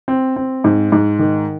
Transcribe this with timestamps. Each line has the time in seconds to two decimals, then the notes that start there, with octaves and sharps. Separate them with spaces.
0.08 C4
0.36 C4
0.64 G#2
0.92 G#2
1.19 D#3